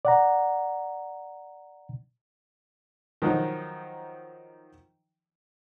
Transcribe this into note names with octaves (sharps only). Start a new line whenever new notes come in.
D5 F#5 A#5
D#3 F3 F#3 D#4